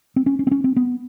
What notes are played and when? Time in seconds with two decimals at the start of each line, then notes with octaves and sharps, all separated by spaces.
0.16 C4
0.26 C#4
0.39 C#4
0.47 C4
0.51 C#4
0.64 C4
0.76 B3